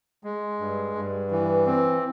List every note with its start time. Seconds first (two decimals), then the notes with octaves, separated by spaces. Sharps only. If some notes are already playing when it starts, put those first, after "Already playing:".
0.24 G#3
0.59 G2
0.95 G2
1.31 E3
1.67 C4